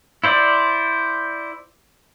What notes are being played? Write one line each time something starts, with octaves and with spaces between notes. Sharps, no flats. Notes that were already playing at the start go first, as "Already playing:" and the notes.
E4 C5 D5